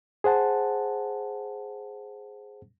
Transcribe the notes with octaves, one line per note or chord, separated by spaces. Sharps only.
G#4 C5 F#5 A5